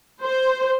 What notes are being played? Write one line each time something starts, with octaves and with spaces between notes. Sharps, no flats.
C5